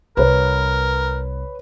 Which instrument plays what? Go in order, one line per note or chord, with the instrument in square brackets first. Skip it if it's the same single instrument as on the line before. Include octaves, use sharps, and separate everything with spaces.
[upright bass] C2 [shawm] A#4 [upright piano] B4 C#5